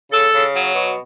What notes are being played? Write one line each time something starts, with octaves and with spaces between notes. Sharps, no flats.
C#3 A4
C#3
F#3
B2